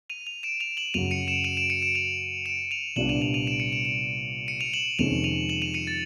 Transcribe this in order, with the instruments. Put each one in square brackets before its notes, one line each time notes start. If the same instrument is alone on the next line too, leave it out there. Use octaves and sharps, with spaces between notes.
[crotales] D#7 F7
D#7 F7
D7 E7
D#7 F7
E7 F#7
[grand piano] F#2 C#3 F#3 [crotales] D#7 F7
[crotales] C#7 D#7
D7 E7
D#7 F7
D7 E7
C#7 D#7
D7 E7
D#7 F7
D7 E7
D#7 F7
[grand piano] C2 A#2 G3 B3 D4 [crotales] E7 F#7
[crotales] D#7 F7
D#7 F7
D#7 F7
D7 E7
C#7 D#7
D7 E7
D7 E7
C#7 D#7
D#7 F7
E7 F#7
[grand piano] F2 C3 D#3 G#3 C#4 [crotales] D#7 F7
[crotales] D#7 F7
E7 F#7
D#7 F7
C#7 D#7
A6